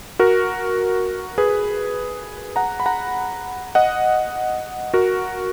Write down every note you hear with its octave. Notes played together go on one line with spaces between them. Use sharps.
F#4 A#4
G#4 B4
F#5 A#5
B5
F#5 A#5
D#5 F#5
F#4 A#4